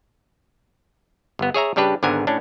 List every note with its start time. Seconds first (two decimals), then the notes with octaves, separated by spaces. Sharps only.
1.39 G1 B3
1.54 G#4 C#5 E5 A#5
1.76 C#3 G3 D4 G4 B4
2.03 G#1 G#2 D3 B3 A#4 G#5
2.27 A2 C#4 D4